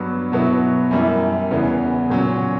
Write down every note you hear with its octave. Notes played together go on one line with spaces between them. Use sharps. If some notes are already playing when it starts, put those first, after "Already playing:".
Already playing: G2 F#3 B3
B2 F#3 B3 E4
F#2 E3 G3 A#3 E4
E2 C#3 E3 B3
A#2 F#3 C#4